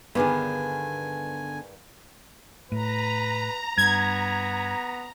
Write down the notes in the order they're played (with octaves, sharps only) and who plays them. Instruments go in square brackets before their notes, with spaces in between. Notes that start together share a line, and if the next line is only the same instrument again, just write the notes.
[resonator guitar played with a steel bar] G2 D#3 G#4 [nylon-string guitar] D3 B3 [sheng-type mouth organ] G#5
[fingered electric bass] A2 [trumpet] B4 [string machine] A#5
[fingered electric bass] G2 [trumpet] B3 [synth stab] G#6